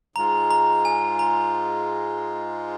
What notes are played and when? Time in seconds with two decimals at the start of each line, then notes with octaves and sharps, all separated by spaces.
0.16 G#2 G#3 F4 A#5
0.51 A#5
0.85 G#5
1.19 A#5